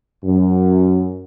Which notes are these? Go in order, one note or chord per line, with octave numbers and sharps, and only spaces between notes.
F#2